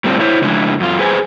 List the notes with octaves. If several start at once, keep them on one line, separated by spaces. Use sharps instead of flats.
A2 G3 A3 C4 D4 F4
E4 C5 C#5 E5
F2 C#3 G#3 D4 E4
F#2 F4
G#4 B4 C5 G5 G#5